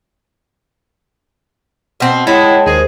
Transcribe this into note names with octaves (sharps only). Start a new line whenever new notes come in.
B2 C4
G#3 E4 C#5 F#5 G5 A5
D#2 G#4 A#4 C5